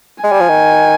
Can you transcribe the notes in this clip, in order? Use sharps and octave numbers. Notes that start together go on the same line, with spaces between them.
G#3 G#5
G3
F3
D#3